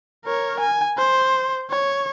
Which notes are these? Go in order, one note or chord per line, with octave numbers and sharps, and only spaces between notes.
A#4 C#5
G#5
C5
C#5